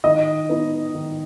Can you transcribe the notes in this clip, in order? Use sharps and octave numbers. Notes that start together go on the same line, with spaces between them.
D#3 D#5
B3 D#4
D#3